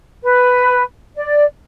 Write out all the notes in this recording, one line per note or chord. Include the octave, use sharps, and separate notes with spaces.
B4
D5